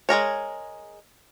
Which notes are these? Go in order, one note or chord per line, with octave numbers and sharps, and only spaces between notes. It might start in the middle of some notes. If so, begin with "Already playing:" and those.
G#3 G#4 A#4 C#5